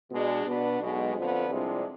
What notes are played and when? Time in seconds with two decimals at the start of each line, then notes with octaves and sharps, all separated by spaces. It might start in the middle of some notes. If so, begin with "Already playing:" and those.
0.11 B2 G#3 D4
0.46 B2 B3 D4
0.80 B1 B2 G#3
1.15 F2 D3 F3 B3
1.50 C2 C3 F3 G#3 D4